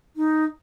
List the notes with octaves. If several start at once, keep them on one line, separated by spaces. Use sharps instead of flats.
D#4